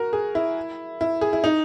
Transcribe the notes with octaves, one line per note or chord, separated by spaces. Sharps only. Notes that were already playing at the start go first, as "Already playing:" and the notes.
Already playing: F#4 A#4
G#4
E4
E4
G#4
E4
D#4